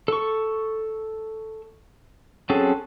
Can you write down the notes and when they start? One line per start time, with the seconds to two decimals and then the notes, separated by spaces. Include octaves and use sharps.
0.08 A4 C#6
2.50 F#3 C4 C#4 G#4 A4